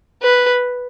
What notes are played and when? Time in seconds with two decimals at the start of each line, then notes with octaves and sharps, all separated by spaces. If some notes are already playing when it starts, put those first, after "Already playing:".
0.22 B4